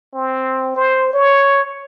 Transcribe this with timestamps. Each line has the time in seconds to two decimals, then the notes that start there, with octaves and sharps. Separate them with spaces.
0.14 C4
0.76 C5
1.13 C#5